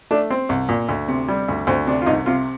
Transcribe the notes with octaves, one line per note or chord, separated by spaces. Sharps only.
A3 D4
C4
C2
A#2
D2
C3
G3
D2
D2 C4
C3 D4
F4
C2 D#4
C3 F4